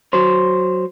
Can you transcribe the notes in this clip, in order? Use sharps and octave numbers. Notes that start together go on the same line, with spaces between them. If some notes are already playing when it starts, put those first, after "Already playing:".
F#3 C5